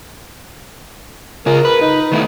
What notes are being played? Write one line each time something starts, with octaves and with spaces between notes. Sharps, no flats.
C#3 F4 G#4 A#4
B4
D#4
D#3 A3 E4